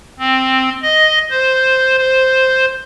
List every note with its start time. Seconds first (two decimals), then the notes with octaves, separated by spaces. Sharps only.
0.19 C4
0.82 D#5
1.31 C5
1.98 C5